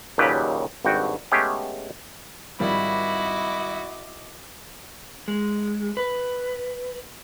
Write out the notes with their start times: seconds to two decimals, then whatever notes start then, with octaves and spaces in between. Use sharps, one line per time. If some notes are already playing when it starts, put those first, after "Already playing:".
0.18 D#2 A#2 C#3 F#3 G4 B4
0.85 G#1 G2 F#4 G5
1.32 G#3 A3 B3 C#4 G4 G#4
2.60 G#1 F3 G3 E4 F#4 D#5 B5 D6
5.28 G#3
5.97 B4